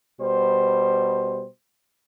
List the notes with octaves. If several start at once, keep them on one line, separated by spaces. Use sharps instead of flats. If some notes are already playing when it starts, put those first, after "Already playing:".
B2 G3 C5